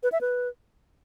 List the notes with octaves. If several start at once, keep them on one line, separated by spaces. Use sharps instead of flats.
B4
E5
B4